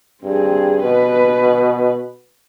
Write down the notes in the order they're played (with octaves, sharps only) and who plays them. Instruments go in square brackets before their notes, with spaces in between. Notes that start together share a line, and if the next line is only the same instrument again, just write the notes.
[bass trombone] G2 [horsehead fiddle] C4 G#4
[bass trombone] B2 [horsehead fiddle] B4